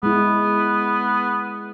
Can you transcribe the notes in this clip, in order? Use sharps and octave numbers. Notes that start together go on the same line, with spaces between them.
G#3 B3 E4